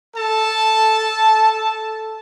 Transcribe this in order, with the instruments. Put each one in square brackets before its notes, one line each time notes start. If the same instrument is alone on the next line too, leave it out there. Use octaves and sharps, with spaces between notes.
[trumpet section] A4 A5